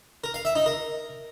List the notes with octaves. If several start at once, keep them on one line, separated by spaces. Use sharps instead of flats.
A#4
F5
E5
D#4
A#4